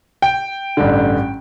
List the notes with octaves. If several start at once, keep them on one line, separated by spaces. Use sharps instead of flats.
G5
A1 G2 D3